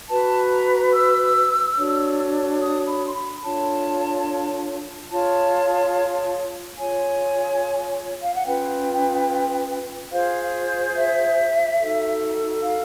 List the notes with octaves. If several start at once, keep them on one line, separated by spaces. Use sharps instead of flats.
F#4 B4 A5
A#5
E6
D4 F#4 A4 C#5
D#6
B5
C6
B5
D4 F4 A4 C#5 A5
F4 G#4 C#5 A5
F4 G#4 C#5 G#5
F5
F#5
C#4 F4 G#4 B4 G5
F4 G#4 C5 F5
E5
D#4 F#4 A4
F5